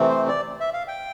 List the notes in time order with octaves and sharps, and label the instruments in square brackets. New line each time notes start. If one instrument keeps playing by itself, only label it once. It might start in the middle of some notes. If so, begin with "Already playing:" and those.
Already playing: [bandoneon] C3 E3 A3 C4
C5
D5
E5
F5
G5